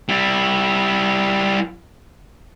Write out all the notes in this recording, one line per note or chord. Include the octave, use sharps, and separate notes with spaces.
G3 E4